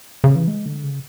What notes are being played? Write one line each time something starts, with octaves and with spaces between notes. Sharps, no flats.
C#3
E3
G#3
D3
C#3